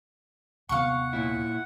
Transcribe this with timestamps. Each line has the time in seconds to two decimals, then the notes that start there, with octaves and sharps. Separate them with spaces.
0.69 D#2 C3 B3 F5 F#5 C#6
1.13 A#2 E4